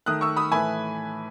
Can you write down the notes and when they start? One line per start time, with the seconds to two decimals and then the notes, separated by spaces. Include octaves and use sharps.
0.06 D#3 A3 D#6 F#6
0.21 C#6 E6
0.36 B5 D#6
0.52 A2 E3 A3 G#5 B5